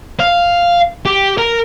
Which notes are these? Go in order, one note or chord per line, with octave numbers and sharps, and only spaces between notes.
F5
G4
A#4